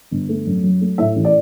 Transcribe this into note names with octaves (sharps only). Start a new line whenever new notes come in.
G1
A3
F#2
F#3
A3
A2 E5
A1
D5